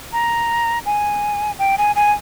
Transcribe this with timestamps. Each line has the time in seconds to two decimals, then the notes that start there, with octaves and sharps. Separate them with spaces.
0.13 A#5
0.86 G#5
1.59 G5
1.78 G#5
1.96 G#5